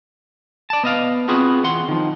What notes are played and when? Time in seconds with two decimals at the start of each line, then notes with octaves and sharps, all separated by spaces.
0.70 D5 A5
0.84 B3 D#5 F5
1.28 B3 C4 F4 F#4 G#4 B4
1.64 E2 F#5 C6
1.89 D#3 F3